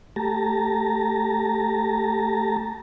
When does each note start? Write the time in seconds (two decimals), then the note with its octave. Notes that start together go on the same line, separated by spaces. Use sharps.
0.16 A3 G4 A5 A#5